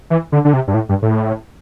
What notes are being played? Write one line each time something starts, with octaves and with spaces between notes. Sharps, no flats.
E3
D3
D3
C3
G2
A2
G2
A2